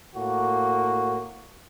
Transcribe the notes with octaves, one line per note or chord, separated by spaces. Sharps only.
A2 A#3 F#4